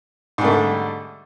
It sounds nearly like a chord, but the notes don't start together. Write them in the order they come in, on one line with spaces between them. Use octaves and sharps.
G#2 G3 A3 D3